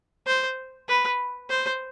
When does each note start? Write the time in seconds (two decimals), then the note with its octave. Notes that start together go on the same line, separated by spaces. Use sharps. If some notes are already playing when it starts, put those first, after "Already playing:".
0.27 C5
0.88 B4
1.50 C5